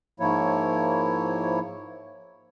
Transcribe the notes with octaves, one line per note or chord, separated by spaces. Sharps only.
G#2 F3 A#3 E4 C#5